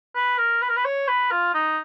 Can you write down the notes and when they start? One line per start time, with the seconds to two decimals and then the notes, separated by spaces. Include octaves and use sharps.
0.15 B4
0.38 A#4
0.62 B4
0.69 A#4
0.76 B4
0.85 C#5
1.08 B4
1.31 F4
1.54 D#4